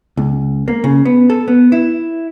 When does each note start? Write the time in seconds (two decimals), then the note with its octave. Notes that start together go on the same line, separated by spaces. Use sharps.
0.17 C#2
0.68 A#3
0.84 C#3
1.05 B3
1.30 A4
1.48 B3
1.72 E4